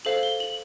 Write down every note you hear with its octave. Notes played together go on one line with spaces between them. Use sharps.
A4 C5 F5 F#7
G7
F#7